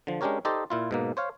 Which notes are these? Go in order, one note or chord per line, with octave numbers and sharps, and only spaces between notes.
D3 F3
G#3 C#4 D4 G4 A#4 C#5
D#4 G4 A4 C5 D5 D#5
A#2 E4 F4
G#2 B2 A#3
C5 C#5 F5